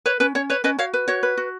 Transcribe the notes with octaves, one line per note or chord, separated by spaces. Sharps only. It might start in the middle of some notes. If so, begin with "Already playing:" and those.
B4 C#5
C#4 B4
C#4 C#5
B4 C#5
C#4 B4 D#5
F#4 C#5 F5
B4
F#4 C#5
B4
F#4